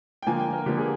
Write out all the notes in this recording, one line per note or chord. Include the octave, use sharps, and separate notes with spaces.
G5
D3 F3 A#3 G#5
G5
A#4
D3 F3 A#3 G4
G#4